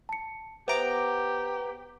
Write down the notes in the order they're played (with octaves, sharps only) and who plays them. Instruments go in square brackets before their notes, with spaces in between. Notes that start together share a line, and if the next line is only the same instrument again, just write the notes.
[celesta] A5 C#7
[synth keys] B3 A#5 D6 [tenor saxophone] G4 [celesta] C5 E5 D7